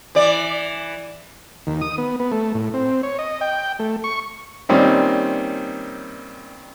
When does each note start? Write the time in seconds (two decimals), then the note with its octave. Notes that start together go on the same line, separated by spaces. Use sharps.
0.15 E3 D5
1.67 D#2
1.81 D#6
1.98 B3
2.19 B3
2.32 A3
2.54 A2
2.74 C4
3.03 C#5
3.19 D#5
3.41 G5
3.79 A3
4.04 C#6
4.69 A#2 D#3 G3 C4 C#4 D#4